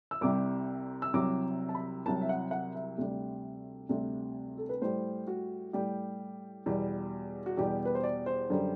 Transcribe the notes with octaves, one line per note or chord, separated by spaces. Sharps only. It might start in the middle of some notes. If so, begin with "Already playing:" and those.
E6
C2 C3 G3 D6
E6
C2 C3 F#3 D6
A5
B5
C2 C3 F#3 A5
E5
F#5
F#5
E5
D2 C3 G3
D2 C3 G3
A4
B4
A2 G3 C5
F#4
A2 G3 G4
E2 B2 G3
F#4
E2 B2 G3 G4
B4
C5
D5
C5
F#2 D3 G3